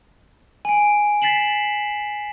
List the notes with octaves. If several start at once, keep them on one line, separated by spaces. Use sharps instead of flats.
G#5 D7
A6 B6 C7 E7 F#7